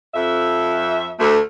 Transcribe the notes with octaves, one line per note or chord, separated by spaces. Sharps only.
F2 E5
D2 A3